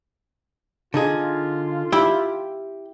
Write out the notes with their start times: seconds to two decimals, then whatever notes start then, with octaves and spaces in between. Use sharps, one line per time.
0.94 D3 D#4 F4 G#4
1.92 E4 G4